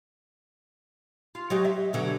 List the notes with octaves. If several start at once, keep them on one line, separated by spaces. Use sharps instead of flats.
F4
F#3 D#4 G4
E5
B2 D3 F#3